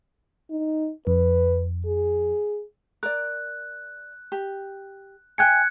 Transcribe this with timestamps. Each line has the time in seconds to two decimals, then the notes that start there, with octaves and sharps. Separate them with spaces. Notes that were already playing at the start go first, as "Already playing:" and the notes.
0.51 D#4
1.07 F2 B4
1.86 G#4
3.03 A#4 D5 F#6
4.32 G4
5.38 E5 G5 G#5 F#6 G#6 C#7